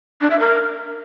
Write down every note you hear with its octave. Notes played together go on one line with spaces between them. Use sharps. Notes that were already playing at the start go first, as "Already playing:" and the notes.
D4
E5
A#4